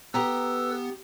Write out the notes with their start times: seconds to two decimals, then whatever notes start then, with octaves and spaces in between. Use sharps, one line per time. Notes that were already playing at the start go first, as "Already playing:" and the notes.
0.14 B3 G4 A4 B4 A#5 E6